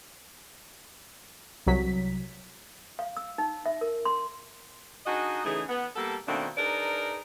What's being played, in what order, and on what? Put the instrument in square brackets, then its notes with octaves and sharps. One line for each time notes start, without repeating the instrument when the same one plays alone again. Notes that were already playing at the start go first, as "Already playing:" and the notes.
[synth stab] C2 F#3 B6
[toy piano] F5
E6
D#4
E5
A#4
C6
[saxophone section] D4 D#4 F#4 G#4 D#5
C#3 E3 A3 C#4 D#4 G#4
B3
G3 A#3 B3 A4
B2 D#3 A3 A#3 C4 D4
D4 D#4 G#4 A#4 B4 D5